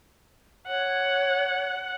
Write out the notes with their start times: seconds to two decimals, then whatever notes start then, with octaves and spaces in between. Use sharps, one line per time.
0.67 C#5 F#5